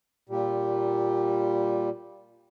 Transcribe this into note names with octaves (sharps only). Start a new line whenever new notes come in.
A#2 G3